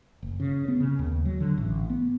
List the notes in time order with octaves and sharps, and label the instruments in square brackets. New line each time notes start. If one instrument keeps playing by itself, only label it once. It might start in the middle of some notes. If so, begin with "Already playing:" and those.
[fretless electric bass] F#1
C#3
B3
C#3
D#2
F#3
D3
A1
B3